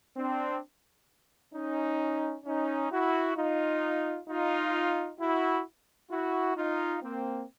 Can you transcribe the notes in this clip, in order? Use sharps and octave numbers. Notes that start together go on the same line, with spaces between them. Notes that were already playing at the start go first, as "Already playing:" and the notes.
C4 D4
C#4 D#4
C#4 D#4
E4 F#4
D#4 F4
D#4 F4
E4 F#4
E4 F#4
D#4 F4
A#3 C4